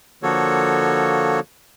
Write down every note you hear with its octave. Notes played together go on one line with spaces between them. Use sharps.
D3 F3 A#3 F#4 A4 C#5